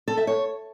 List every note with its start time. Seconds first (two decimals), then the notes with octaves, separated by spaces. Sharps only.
0.08 A4
0.17 E5
0.27 C#5